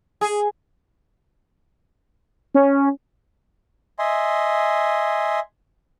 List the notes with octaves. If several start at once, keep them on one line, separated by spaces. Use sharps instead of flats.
G#4
C#4
D#5 E5 G#5 C6